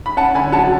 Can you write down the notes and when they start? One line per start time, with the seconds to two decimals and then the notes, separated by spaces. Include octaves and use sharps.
0.06 B5
0.17 C#4 F#5 A5
0.35 D3 G#5 B5
0.52 F#3 F#5 A5